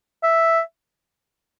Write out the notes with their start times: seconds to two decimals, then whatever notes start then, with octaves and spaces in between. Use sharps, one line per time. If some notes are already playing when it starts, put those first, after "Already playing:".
0.23 E5